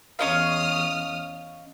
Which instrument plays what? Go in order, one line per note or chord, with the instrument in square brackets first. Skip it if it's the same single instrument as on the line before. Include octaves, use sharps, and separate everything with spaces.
[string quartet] E2 D#6 F6 [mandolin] C#4 D#5 F5